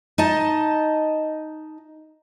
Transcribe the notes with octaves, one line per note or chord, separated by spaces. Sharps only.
D#4 D#5 A5